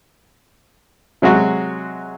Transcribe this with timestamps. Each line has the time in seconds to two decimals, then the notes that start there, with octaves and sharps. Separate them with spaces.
1.22 C3 F#3 G#3 F#4